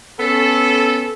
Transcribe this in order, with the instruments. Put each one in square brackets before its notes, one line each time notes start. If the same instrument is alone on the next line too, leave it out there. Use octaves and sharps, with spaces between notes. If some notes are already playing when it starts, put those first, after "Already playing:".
[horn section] B3 C#4 A4